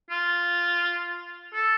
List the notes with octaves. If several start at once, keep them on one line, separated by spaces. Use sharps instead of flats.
F4
A4